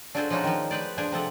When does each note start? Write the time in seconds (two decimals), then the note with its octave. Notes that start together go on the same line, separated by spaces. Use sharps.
0.15 D4 F4 F#4 G#4 A4 C5
0.30 F3 G#3 C#4 D#4 F4 F#4
0.44 D#3 F3
0.71 B4 C5 D5
0.98 F3 D4 G#4 C5
1.12 C3 F3 A4 F#5